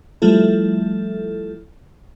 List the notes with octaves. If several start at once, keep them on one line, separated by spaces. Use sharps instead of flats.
F3 G3 A3 E4 A4